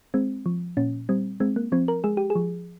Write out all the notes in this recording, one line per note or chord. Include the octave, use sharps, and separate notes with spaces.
G#3 C4
F3
A#2 C#4
G3 C4
G#3 C4
A#3
F3 C4
A#4
G#3 G#4
G4
G#4
F3